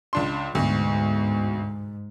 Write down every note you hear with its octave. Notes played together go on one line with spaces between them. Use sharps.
C#2 D4 C6
D2 G#2 B2